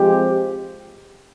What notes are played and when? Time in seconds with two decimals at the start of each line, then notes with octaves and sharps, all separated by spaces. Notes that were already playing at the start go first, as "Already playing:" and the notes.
Already playing: F3 G#3 C4 G4